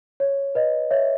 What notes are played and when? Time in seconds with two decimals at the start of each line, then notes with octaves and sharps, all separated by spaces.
0.20 C#5
0.55 B4 D#5
0.91 C#5 E5